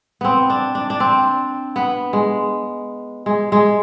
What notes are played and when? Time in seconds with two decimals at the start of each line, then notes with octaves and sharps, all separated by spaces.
0.21 B3 C4
0.50 D4
0.75 D4
0.90 D4
1.00 C4
1.76 B3
2.13 G#3
3.26 G#3
3.52 G#3